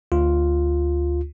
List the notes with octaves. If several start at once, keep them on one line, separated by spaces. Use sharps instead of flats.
D2 F4